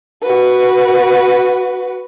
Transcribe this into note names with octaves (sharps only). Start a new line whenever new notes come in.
F#4 B4